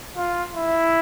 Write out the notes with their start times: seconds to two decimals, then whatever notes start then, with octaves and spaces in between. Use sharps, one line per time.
0.16 F4
0.56 E4